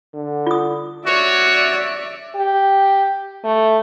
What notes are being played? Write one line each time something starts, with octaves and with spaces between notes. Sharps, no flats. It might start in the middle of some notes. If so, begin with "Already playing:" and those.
D3
F4 D#6
F#4 C#5 D5 E5
G4
A3